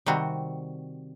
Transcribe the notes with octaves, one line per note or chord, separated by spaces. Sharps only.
C3 D#3 G3 C4 F#4